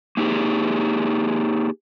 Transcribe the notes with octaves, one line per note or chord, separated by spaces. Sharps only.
A#3 D#4 F4 G4 G#4